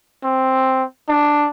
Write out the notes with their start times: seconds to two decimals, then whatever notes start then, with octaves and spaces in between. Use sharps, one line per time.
0.24 C4
1.08 D4